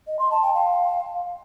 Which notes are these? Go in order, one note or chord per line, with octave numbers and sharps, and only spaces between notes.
D#5
C6
A5
G5
F5